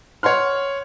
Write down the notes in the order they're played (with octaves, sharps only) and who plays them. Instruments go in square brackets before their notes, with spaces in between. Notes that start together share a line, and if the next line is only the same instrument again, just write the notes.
[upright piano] C#5 F#5 C6 F6